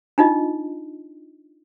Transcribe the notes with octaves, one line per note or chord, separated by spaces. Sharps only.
D4 D#4 F4 D#5